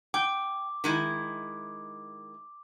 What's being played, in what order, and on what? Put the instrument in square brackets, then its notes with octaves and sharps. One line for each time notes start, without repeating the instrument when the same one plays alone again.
[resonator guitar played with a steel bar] G5 [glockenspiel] D6
[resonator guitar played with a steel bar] D#3 G#3 E4